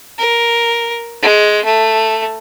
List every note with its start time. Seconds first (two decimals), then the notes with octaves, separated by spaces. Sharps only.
0.19 A#4
1.23 G#3
1.65 A3